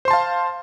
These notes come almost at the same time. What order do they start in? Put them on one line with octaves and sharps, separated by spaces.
C5 C6 A5 F5